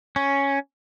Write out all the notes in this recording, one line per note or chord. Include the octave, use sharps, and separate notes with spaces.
C#4